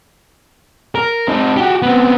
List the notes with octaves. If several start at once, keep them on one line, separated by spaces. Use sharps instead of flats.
A#4
C4 D#4
F#4 G4
B3 C4